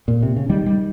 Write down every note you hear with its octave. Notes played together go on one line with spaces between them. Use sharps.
A#2
C3
C#3
D#3 G3
G3